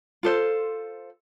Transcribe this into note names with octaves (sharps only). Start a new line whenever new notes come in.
F4 A4 C5